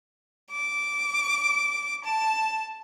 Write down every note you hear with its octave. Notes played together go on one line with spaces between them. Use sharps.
D6
A5